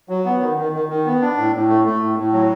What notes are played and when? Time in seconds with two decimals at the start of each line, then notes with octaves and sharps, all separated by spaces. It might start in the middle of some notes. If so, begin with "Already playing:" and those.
0.09 F#3
0.25 B3
0.40 D#3
0.57 D#3
0.72 D#3
0.89 D#3
1.05 B3
1.21 D4
1.37 A2
1.53 A2
1.69 A3
1.85 A3
2.01 A2
2.18 A2
2.32 F#3